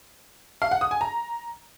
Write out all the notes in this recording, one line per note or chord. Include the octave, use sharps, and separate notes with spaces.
F5
F#5
D#6
G#5
A#5